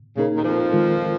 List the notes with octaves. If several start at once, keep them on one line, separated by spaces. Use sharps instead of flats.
A#2 C#3 A#3 D#4 A#4
D#2 D#3
F2 F3
D#3 G#3 F4 A#4